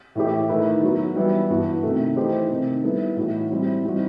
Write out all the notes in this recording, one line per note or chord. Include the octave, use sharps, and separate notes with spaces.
A2 E3 A3 E4 G4
D#3 A3 E4 B4
F#3 B3 F#4
E3 G3 B3 E4
G2 E3 B3 F#4
C3 D#3 A3
E3 A3 D#4 G4 C5
C3 D#3 A3
G3 B3 E4 A4
A2 E3 A3 D#4 F#4
G3 C4 E4
E3 G3 C4 D#4 F#4